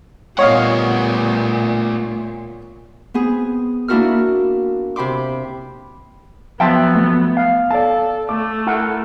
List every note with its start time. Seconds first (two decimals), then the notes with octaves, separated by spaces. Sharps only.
0.39 A#2 G3 A3 B3 C#5 D#5 F5 F#5
3.14 B3 C4 G#4
3.88 A#3 D4 E4 F#4 A#4 F6
4.96 C3 G5 B5 C6 D6
6.60 F3 F#3 B3 E5 G5 A5 C6
6.95 A3
7.37 F5
7.71 A4 D5 A5
8.29 A3 D6
8.67 E4 A#4 F#5